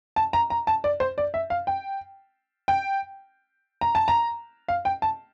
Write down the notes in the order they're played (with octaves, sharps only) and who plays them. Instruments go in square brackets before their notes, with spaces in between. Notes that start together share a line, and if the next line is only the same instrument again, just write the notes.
[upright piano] A5
A#5
A#5
A5
D5
C5
D5
E5
F5
G5
G5
A#5
A5
A#5
F5
G5
A5